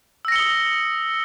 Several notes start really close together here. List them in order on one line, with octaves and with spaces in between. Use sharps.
E6 A#6 C#7 G7 D#6